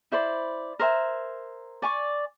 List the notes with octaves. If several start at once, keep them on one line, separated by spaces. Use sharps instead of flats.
E4 C5 D5 B5
A#4 C5 E5 G#5
D5 G#5 C#6